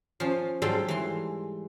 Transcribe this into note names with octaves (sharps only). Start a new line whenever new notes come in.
F3 C#4
G#2 F#3 G3 A4 G5 C6
E3 C6